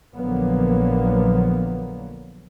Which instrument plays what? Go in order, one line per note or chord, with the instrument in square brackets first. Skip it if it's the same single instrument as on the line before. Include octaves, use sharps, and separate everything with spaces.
[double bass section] A#1 D3 F3 F#3 A#3 B3